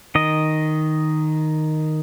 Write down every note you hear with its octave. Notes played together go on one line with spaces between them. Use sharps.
D#3 D#5